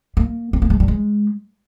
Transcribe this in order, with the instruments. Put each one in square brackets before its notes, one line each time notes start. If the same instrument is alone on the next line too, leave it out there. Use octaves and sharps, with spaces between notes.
[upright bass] A#3
C4
A#3
G#3
G3
G#3